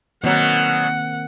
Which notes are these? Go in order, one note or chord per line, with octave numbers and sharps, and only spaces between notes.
B2 D#3 F#3 A#3 C4 F#5